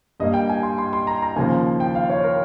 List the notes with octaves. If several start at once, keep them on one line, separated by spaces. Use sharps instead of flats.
G2 G3 A#3 D#5
G5
G#5
C6
C6
C6
A#5
A#5
D#2 C#3 F3 A#3 G#5
G5
F5
C#5
A#4